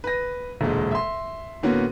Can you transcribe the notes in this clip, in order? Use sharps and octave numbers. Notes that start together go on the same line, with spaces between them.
B4 A#6
E1 D2 A#2 G#3
E5 C6
A2 D3 A#3 B3 C#4 F#4